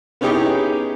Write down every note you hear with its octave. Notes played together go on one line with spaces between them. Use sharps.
B3 C#4 D#4 E4 G4 G#4